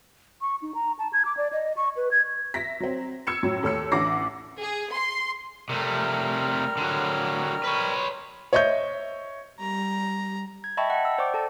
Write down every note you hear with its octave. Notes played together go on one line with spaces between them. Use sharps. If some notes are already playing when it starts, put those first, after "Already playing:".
C#6
D#4
A#5
A5
G#6
D6
D5
D#5
C#6
B4
G#6
E5 A#6 B6
F#3 C4
E6 G#6 C#7 E7
F#2 A2 F#3
D#2 A3 C#5 E6 C#7
A1 D4 F#5 D6 A#6 C7
G#4
C6
C3 G3 A3 A#4 F6
D3 F#3
B4 C#5
C#5 D#5 E5 C#6 G6
G3 A#5
G#6
D#5 E5 G5 A5 B5 C#6
F#5
E6
C5 D5 G5 C#6 D6
A4 A5